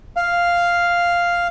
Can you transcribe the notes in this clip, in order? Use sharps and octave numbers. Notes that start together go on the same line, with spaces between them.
F5